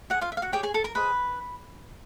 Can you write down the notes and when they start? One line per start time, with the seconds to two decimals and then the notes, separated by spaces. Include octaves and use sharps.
0.10 F#4 C#5 F#5
0.14 G#4
0.21 F4 F5
0.32 E5
0.37 F5
0.42 F#4 F#5
0.52 G4 G#4 C#5 G5
0.63 G#4 G#5
0.74 A4 A5
0.84 A#4 A#5
0.95 G#4 B4 C5 D#5 B5